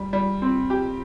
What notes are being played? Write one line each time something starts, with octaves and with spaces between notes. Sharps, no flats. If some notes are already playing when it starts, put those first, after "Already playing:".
Already playing: G3
G3
C4
G4